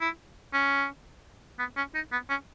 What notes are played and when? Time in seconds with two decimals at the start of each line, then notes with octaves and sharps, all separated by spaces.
0.01 E4
0.53 C#4
1.59 B3
1.77 C#4
1.94 D#4
2.12 B3
2.30 C#4